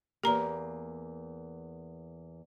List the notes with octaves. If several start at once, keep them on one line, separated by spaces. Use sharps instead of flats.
E2 A#3 G4 A#5